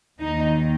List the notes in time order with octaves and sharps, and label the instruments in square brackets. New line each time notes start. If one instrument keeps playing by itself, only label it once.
[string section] D#2 D#3 D#4